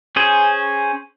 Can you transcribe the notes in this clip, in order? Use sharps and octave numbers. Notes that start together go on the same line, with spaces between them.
C#4 G#4 C5